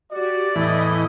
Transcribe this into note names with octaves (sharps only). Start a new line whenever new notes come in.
F#4 G4 D5
E2 A2 E3 E4 D#5